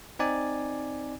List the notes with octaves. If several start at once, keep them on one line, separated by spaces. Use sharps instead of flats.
C4 D#4 D5 G#5